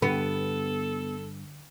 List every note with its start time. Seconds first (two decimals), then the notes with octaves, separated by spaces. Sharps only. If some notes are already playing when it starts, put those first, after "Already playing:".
0.02 G2 D3 B3 A4